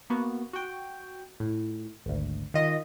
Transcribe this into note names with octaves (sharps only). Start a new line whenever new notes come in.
A#3 B3 F#4
F#4 G5
A2
G#1 D2
D#3 F4 D#5